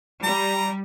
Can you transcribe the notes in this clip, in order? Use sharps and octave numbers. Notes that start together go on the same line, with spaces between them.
G3 A#5